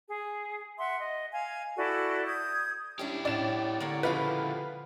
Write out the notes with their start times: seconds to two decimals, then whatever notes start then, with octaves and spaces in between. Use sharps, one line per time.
0.08 G#4
0.79 E5 F#5 C6
0.99 D#5
1.32 F5 G#5
1.77 E4 F#4 A4 D5
2.26 D#6 G6 G#6
2.99 G3 C#4 D4 E4 G4
3.25 A2 C#4 D5 E7
3.80 A2 D3 A#3 C#5
4.03 A#2 C#3 F3 F4 B4